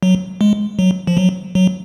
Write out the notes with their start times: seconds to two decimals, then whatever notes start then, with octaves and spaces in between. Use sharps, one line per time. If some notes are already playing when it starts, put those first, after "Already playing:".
0.03 F#3
0.41 G#3
0.79 F#3
1.07 F3
1.17 F#3
1.55 F#3